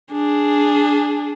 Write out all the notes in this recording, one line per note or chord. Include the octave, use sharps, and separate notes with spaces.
D4 G#4